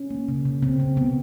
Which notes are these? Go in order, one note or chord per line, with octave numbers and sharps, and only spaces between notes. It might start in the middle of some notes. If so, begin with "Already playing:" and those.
Already playing: C#4
A#3
C#3
C#3
C#3 C4
C#3
C#3 B3